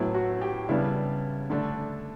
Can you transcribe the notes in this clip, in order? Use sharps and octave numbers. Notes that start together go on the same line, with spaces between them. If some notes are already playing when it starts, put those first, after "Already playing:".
Already playing: A2 F#3 B3 E4
F#4
G4
C#3 G3 B3 D4 E4
D3 A3 D4